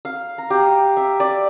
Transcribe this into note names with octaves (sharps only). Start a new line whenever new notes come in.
F5
A#5
G4
E5
D5